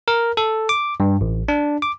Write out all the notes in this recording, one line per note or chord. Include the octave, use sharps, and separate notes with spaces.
A#4
A4
D6
G2
A1
D4
D6